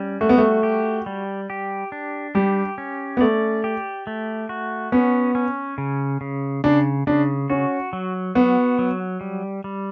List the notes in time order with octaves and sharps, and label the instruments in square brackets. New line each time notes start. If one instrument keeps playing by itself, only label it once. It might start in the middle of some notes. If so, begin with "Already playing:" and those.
Already playing: [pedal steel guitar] G3 C#4
[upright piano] A3 [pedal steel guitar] F#4
[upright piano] B3
A3
[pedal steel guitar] G4
G3
G4
D4
[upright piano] G3 [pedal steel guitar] G4
[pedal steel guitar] C#4
[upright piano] B3
[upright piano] A3 [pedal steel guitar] D5
[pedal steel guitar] G4
A3
F#4
[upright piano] B3 [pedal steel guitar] C#4
[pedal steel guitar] C#4
C#3
C#3
[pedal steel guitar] C#3 [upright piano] D4
[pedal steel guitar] C#3 [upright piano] D4
[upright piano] C#4 [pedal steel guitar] F#4
[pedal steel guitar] F#3
[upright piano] B3 [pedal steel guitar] F#4
[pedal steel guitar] F#3
G3
G3